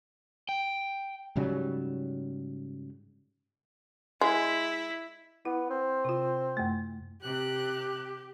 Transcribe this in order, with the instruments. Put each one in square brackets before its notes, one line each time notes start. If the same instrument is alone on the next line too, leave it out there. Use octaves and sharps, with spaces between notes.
[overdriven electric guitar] G5
[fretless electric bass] G#2 C#3 F#3 G3
[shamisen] G#3 [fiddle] E4
[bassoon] B3 [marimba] E4
[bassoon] C4
[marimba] C3 F4
F#2 A3
[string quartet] C3 F#6 [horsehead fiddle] G4